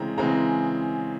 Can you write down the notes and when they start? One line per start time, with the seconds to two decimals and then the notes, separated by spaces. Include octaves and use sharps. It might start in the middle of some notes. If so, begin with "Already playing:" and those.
Already playing: C#3 E3 G#3 C4 A#5
0.18 C#3 E3 G#3 C4 A#5